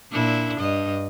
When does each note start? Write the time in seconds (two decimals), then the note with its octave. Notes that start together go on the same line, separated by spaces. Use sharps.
0.12 A#2 D4 E4
0.58 G2 D#5